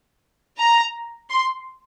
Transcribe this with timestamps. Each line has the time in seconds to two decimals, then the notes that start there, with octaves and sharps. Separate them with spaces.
0.59 A#5
1.30 C6